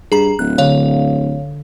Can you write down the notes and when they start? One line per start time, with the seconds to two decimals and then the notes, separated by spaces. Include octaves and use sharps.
0.12 G2 G#4 A#5 B5 B6
0.39 D1 F#6
0.58 D3 C#5 F5